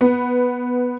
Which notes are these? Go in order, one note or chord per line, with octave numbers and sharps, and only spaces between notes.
B3